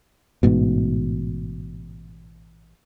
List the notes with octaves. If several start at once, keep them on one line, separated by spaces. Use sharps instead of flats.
A1 G#2 B2